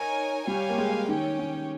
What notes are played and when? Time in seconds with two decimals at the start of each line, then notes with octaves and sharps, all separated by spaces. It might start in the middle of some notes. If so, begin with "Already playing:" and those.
Already playing: D#4 A#4 C#5 G#5
0.47 G3 G4 C#5 F5 G#5
0.70 A#3
0.78 G#3
1.08 D#3 C#4 G4 C#5 G5
1.39 D#3